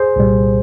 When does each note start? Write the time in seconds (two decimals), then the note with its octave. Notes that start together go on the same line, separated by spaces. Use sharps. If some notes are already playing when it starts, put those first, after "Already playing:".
Already playing: G#4 C5
0.16 C2 A#2 G3